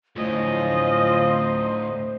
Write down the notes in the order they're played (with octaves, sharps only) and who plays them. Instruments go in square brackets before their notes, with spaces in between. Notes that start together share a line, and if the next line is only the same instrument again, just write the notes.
[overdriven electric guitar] D2 A2 [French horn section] F3 C#4 F4 [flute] C5 [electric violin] D#5